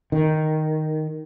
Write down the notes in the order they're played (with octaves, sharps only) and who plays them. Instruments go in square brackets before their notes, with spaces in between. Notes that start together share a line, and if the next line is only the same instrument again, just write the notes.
[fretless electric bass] D#3